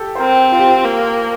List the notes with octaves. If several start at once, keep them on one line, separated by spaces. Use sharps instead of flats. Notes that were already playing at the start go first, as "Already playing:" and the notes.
Already playing: G4 A4
C5
C4 A#4
F4
G4
F4
A#3